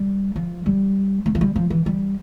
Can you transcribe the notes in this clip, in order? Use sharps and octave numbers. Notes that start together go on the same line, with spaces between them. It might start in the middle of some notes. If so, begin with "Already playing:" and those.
Already playing: G3
F3
G3
A3
F3
G3
F3
E3
G3